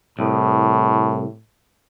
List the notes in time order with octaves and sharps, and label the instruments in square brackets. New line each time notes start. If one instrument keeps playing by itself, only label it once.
[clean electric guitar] C2 [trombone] A2